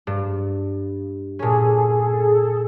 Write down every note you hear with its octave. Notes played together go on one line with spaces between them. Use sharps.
G2
A#2 C#4 G#4 A4